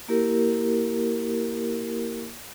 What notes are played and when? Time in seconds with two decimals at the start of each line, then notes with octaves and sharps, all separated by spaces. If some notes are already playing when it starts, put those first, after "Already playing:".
0.08 A#3 E4 G4 A#4